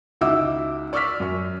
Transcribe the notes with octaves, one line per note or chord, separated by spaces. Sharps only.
C#2 D#4 E4 F#4 D6 E6
D5 C#6 D6 E6 F6 B6
F#2 C#6